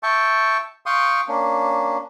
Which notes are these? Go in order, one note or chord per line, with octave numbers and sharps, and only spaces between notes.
E5 G5 A5 C#6
F5 G5 C6 C#6 D#6
A#3 C#4 D4